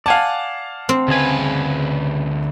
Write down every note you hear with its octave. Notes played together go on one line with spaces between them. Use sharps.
D5 F5 F#5 G#5 A5
C4
D2 C#3 B4 G#5